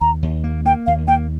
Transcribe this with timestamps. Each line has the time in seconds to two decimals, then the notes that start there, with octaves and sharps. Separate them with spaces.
0.01 D#2 A#5
0.23 D#2
0.44 A#3
0.65 A#3 G5
0.86 D#2 F5
1.08 A#3 G5